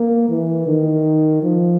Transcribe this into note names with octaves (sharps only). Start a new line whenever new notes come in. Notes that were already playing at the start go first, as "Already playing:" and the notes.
Already playing: A#3
E3
D#3
F3